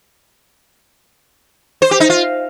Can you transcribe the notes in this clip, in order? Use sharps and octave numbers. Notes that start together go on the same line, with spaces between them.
C5
G4
D#4
F4